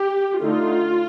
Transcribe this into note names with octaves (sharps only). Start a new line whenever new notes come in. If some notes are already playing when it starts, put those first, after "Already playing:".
Already playing: G4
D3 A3 D#4 F4